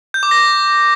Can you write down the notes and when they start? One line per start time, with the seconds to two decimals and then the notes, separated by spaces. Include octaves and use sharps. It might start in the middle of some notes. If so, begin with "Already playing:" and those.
0.14 G6
0.23 D6
0.31 A#6